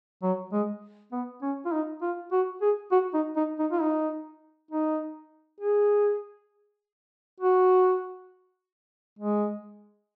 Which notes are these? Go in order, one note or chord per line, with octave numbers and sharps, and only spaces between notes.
F#3
G#3
B3
C#4
F4
D#4
F4
F#4
G#4
F#4
D#4
D#4
D#4
F4
D#4
D#4
G#4
F#4
G#3